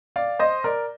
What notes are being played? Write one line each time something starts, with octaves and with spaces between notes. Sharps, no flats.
D5 F5
C5 D#5
A#4 D5